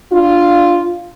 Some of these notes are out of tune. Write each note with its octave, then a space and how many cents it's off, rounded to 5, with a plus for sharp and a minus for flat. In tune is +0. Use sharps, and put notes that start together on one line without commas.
D4 +5 F4 +0